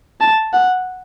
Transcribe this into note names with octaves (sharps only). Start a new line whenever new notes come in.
A5
F#5